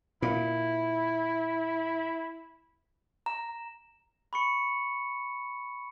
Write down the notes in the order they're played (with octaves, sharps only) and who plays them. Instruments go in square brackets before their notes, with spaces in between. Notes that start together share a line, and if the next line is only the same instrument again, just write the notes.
[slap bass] A#2 [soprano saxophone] E4
[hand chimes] A#5
[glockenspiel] B5 C#6 C#7